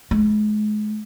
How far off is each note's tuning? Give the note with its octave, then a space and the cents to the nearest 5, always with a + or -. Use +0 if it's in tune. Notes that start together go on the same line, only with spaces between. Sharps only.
G#3 +35